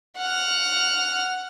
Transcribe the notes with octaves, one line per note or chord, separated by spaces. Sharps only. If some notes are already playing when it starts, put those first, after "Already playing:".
F#5 F6